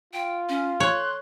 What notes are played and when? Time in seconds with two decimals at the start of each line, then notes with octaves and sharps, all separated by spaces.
0.13 F4 G5
0.49 C#4
0.80 C#5 C6 F#6